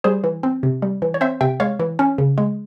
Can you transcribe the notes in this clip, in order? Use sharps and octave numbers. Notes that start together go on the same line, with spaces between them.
G3 G#4 C5
E3
C4
C3
G3
E3
C#5
C4 C5 E5
C3 E5 G5
G#3 C#5 F5
E3
C#4
C#3
G#3